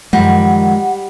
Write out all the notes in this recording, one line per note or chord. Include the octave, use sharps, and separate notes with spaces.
F#2 D#3 F3 G3 G#3 F#5